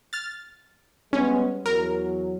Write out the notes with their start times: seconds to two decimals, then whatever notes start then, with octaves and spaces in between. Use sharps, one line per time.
0.13 F6 A6
1.13 G3 G#3 B3 C#4
1.66 E2 F#3 A#4